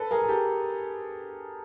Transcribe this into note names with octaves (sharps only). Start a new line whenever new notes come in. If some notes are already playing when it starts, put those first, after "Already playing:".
Already playing: A4 B4
G#4 A#4
G#4
G4 A4